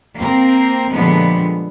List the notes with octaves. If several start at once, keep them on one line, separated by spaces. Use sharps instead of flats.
A#3 C4 A#4
A#2 D3 F3 G3 G#3 B3